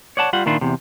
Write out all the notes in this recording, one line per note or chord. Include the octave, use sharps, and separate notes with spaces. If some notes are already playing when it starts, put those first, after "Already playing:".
C#5 D5 F#5 A5
G3 F4 F#5
A#2 D#3 D4 E4 F4
E2 C3